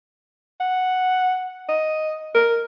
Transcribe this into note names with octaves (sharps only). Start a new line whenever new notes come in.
F#5
D#5
A#4